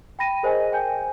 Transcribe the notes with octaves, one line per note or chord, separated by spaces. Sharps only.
G5 B5 A#6 D#7
G#4 A#4 C5 D#5 G#5
G5 G#5 G6